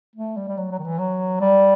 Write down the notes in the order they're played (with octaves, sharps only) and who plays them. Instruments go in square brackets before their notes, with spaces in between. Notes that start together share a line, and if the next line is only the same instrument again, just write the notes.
[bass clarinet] A3
G3
G3
F#3
F#3
D#3
E3
F#3
G3